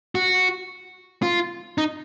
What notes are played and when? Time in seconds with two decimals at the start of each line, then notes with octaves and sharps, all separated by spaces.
0.15 F#4
1.23 F4
1.78 D#4